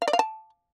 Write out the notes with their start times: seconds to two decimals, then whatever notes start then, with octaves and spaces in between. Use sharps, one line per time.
0.02 F5
0.08 D5
0.13 F5
0.19 A5